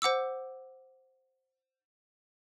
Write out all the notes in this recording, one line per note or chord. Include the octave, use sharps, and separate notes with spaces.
C5 F#5 D6 E6